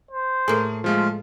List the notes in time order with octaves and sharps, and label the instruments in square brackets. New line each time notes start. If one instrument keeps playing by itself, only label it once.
[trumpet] C5
[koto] A2 A#3 [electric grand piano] A3 G#4
[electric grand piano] F3 G#3 A3 [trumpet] F4